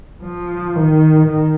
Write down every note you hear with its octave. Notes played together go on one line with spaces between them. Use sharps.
F3
D#3
D#3